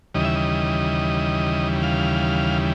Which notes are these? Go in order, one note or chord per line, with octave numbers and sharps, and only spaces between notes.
D#2 C#3 E3 G3 D#5
E5
D#5
F5